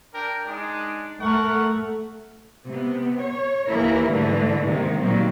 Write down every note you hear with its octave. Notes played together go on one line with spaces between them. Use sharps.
D4 A#4 G5
G#3 D4 D#4
A3 A#4 F#5 C#6
C3 B3
C#5
D#2 E3 A#3 E4 A#4
G#2 D3 E3 G3 A3
C3 D#3 G#3 A#3
A#2 D#3 F#3 G3 A#3 C4